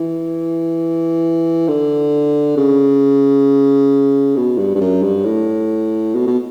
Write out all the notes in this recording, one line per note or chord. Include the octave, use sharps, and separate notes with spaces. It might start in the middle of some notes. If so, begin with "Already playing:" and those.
Already playing: E3
D3
C#3
B2
G2
G2
F#2
G2
A2
B2
B2